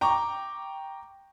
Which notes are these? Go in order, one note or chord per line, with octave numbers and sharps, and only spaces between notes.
G5 A#5 C#6 D6